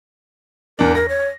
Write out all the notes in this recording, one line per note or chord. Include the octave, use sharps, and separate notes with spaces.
E2 D4 A#4
A#4 A#6
C#5